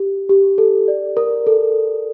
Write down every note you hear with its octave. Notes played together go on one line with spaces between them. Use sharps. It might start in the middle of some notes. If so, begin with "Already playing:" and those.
Already playing: G4
G4
A4
D5
A#4
A4